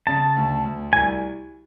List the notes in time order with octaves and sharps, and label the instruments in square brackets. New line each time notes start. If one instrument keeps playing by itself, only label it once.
[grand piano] C#3 [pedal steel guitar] A5
[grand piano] D2
D2
[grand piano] C2 [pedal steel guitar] G#5